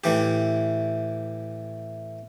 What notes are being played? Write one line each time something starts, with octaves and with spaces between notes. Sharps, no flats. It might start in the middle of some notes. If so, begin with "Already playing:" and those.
A2 E3 G4